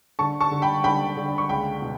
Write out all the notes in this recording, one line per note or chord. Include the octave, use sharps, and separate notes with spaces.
D3 A5 C#6
A5 C#6
D3
G5 B5
D3 G5 B5
D3
C#6
C#2 G5 B5
B2